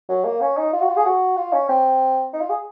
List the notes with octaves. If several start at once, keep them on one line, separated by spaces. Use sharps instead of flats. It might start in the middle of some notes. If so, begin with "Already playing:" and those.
F#3
A#3
C#4
D#4
F4
F#4
F4
G#4
F#4
F4
C#4
C4
D#4
F4
G#4